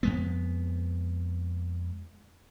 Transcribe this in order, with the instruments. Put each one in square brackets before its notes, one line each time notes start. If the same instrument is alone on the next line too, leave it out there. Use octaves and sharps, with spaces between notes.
[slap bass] F2 G#3 B3